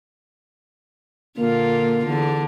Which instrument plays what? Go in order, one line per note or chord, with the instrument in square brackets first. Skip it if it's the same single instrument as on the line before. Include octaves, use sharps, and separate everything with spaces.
[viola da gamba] A#2 D3 F4 [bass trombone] A#3
[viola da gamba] E2 D3